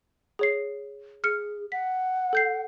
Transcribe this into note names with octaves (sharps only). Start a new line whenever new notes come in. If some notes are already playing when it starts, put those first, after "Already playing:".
G#4 C#5 C7
G#4 F6 C#7
F#5 B6
A4 G6 C7